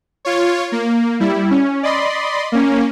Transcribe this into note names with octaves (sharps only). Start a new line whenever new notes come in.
F4 C#5
A#3
G3 E4
C#4
D5 D#5 B5 C6
A#3 C#4